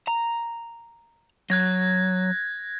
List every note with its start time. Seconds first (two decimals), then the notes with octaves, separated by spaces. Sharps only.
0.08 A#5
1.50 F#3 F#6 G#6 A#6